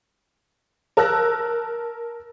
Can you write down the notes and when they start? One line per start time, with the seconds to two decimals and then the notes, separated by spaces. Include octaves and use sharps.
0.97 A#4 A5 E6 F#6 A#6